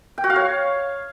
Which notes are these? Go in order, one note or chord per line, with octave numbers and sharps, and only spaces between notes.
G5
F#4
F5
C#5